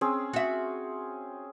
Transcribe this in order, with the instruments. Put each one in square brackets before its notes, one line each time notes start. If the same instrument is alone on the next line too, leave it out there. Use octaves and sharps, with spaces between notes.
[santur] C4 C#4 G#4
[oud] F#4 E5